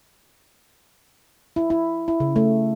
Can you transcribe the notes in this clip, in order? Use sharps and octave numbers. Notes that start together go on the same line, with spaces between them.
E4
E4
E4
C#3
A3